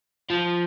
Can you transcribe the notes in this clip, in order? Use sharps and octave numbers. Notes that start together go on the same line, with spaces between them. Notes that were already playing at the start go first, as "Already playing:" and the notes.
F3